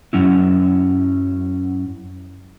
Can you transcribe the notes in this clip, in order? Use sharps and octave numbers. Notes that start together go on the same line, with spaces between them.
F#2 F#3 C#4 E4